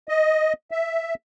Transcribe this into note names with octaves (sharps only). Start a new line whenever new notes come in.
D#5
E5